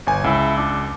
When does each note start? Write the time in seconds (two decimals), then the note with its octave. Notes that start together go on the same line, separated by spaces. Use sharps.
0.07 G1 G#5
0.24 C#2 E4
0.57 D4